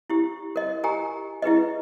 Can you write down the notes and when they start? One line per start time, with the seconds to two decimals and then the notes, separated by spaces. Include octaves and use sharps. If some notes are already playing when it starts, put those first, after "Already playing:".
0.10 E4 G4
0.56 A#4 D#5
0.84 G4 A#4 G#5 A#5
1.42 E4 G#4 B4 D#5